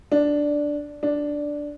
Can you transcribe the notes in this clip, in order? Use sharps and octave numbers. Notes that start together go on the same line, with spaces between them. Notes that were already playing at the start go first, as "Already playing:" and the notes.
D4
D4